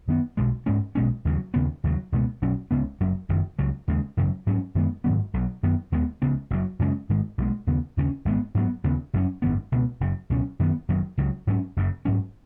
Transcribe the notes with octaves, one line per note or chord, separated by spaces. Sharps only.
F#2 D#3 B3
B1 B2 G#3
G#2 G#3 C#4
B1 B2 G#3 C#4
D#2 C#3 F#3
D#2 C#3 B3
D#2 C#3 F#3
C#2 B2 G#3 B3
B1 B2 F#3 C#4
C#2 C#3 B3
F#1 F#2 F#3
F#1 F#2 D#3
C#2 C#3 F#3
D#2 C#3 G#3
G#1 F#2 C#3 F#3
G#2 F#3 C#4
F#2 D#3 G#3 B3
G#2 D#3 F#3 B3
B1 B2 F#3
F#2 D#3 B3
D#2 D#3 G#3 B3
C#2 C#3 B3
F#1 F#2 F#3
F#2 C#3 G#3 C#4
G#2 D#3 G#3
B1 B2 G#3
D#2 C#3 B3
D#2 C#3 G#3 C#4
G#1 G#2 G#3 B3
G#2 F#3 B3
D#2 C#3 B3
F#1 F#2 F#3 C#4
G#1 F#2 D#3 B3
C#2 B2 B3
F#1 F#2 C#3
C#2 B2 F#3 C#4
F#2 D#3 B3
F#1 F#2 D#3 F#3
C#2 C#3 F#3
G#2 F#3 C#4
F#1 F#2 C#3
G#2 F#3 C#4